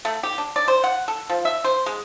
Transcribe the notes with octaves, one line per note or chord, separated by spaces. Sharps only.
A3
G4
D4
D5
C5
F#5
A4
F3
E5
C5
G#3